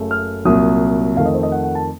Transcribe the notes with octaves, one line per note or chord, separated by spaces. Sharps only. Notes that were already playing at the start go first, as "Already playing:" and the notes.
Already playing: F#1 F#2 C#3 A3
F6
C2 A#2 F#3 D#6
F2 D#3 A3 F5
D#5
C5
D#5
F#5
F#5
A5